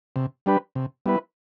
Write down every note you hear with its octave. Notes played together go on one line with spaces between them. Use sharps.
C3
G3 D4 G4 B4
C3
G3 B3 E4 B4